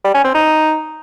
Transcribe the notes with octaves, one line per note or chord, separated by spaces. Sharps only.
G3
C#4
C4
D#4